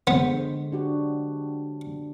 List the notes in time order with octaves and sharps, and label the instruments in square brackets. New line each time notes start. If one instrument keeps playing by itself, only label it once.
[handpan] D3 G#3 C5 [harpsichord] B3
[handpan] D4 F#4 G4